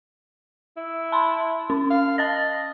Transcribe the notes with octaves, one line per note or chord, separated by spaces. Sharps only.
E4
A5 B5 C6
C#4
F5
D#5 A5 A6 A#6